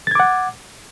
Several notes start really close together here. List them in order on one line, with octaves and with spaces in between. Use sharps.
A6 G#6 D6 F#5